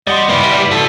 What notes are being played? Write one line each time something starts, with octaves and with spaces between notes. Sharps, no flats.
G3 D5 D#5 F#5 C6
A#3 E4 B4 F5 D6
F#4 A4 B4